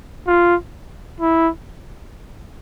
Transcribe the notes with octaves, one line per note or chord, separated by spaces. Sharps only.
F4
E4